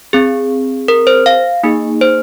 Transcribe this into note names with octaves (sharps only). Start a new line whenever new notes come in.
C4 G#4
A#4
C5
F5
A#3 D#4 G#4
C5